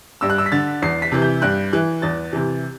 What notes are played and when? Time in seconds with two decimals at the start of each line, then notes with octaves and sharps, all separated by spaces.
0.21 G2 E6
0.30 F#6
0.38 E6
0.46 B6
0.52 D3 A6
0.82 E2 C7
1.02 B6
1.12 C3 E3
1.22 G6
1.42 G2 F#6
1.73 E3 F#6
2.02 E2 A6
2.33 C3 E3